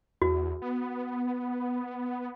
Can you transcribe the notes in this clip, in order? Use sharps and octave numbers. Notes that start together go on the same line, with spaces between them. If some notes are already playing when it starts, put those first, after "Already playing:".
E2 F#4
B3